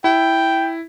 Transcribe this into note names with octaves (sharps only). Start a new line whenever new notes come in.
E4 G5